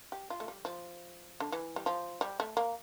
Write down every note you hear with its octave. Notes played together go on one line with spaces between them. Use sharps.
G4
F4
A3
G3
F3
D3
E3
G3
F3
G3
A3
A#3